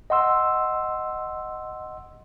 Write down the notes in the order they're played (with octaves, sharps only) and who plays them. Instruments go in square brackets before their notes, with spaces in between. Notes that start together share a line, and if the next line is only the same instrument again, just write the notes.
[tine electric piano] D#5 F#5 C6 E6